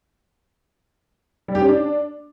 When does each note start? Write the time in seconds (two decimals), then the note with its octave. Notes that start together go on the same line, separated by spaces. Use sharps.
1.48 G3
1.55 G4
1.62 C#4
1.68 D4